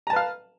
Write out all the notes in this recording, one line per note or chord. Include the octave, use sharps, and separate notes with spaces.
B4 F5 A5 A#5